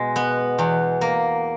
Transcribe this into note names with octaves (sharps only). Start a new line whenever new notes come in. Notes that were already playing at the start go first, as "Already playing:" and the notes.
Already playing: B2 G#3
B3
E2
A#3